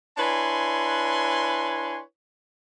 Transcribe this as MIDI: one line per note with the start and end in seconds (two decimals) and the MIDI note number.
0.18 2.00 62
0.18 2.00 64
0.18 2.00 71
0.18 2.00 73
0.18 2.00 80
0.18 2.00 84